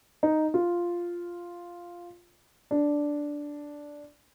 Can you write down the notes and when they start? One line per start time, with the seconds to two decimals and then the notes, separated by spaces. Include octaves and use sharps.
0.23 D#4
0.54 F4
2.71 D4